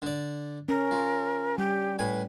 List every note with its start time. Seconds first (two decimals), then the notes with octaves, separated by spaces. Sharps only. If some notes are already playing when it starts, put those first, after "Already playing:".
0.02 D3 D5
0.69 C#4 A#4
0.91 F3
1.58 G3 G4
1.99 A2 B4 G#5